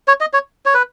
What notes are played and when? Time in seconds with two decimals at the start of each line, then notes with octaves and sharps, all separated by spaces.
0.08 C#5
0.21 D#5
0.34 C#5
0.66 C#5
0.74 B4